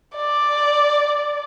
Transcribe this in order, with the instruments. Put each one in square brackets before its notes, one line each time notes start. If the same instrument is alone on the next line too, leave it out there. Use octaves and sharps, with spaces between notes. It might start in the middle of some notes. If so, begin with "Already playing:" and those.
[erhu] D5